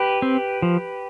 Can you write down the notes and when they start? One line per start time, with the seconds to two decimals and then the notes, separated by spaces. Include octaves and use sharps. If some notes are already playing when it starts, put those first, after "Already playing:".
Already playing: G4 B4
0.22 C4
0.62 F3